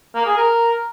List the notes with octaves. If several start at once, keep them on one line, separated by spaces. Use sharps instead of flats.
A#3
G#4
A#4